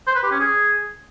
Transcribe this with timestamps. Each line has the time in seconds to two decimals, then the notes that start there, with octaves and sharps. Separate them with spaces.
0.07 C5
0.15 B4
0.23 G4
0.31 C#4
0.39 G#4